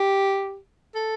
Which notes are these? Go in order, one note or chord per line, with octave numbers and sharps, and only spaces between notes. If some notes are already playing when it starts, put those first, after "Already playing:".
Already playing: G4
A4